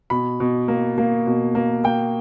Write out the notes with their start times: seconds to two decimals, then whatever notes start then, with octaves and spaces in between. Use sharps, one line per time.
0.10 B2 B5
0.40 B2
0.68 A#3
0.98 A#3
1.27 B2
1.55 A#3
1.84 A#3 G5